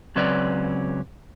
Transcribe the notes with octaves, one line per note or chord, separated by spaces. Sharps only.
C#2 F#3 C4 C#4 B4 D5